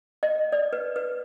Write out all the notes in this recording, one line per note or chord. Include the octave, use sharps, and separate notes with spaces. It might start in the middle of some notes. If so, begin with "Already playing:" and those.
D#5
D5
B4
B4